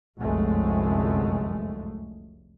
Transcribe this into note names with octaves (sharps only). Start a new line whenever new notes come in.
F1 C2 F#2 D3 G#3 A3